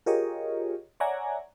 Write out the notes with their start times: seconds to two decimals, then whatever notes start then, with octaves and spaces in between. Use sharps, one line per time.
0.06 F4 G4 G#4 A#4 C#5 D#5
1.00 C#5 D5 E5 F#5 G#5 A#5